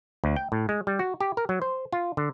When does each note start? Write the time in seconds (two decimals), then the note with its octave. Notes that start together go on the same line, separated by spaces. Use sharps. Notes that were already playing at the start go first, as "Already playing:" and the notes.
0.24 D2
0.36 G5
0.52 A2
0.69 G#3
0.87 G3
0.99 F#4
1.21 G4
1.37 A#4
1.49 F#3
1.62 C5
1.93 F4
2.17 D3